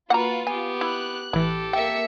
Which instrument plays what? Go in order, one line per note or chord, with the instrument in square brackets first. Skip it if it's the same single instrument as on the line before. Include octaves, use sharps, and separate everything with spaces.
[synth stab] A#3 [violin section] F4 [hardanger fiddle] F#4 B4 [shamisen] F#5 A#5
[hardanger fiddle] B3 G4 [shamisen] G#5
[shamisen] E4 [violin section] F#6
[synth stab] A1 E3 [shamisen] E4 [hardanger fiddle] G4 A4
[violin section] A#3 E5 C#7 [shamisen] G5